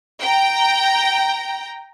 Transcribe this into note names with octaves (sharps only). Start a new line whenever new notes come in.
G5 A#5